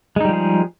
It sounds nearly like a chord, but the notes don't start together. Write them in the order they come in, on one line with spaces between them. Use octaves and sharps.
G#3 D#4 G3 F3 G#4